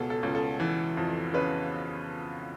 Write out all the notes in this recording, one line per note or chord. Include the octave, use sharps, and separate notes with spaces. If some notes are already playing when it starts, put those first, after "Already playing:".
Already playing: C#2 B2 G#4 A4
A4
C#2
A4
E3
F2
C#3 B4